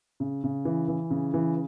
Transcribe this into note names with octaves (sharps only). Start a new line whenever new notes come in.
C#3
C#3
E3
E3
C#3
E3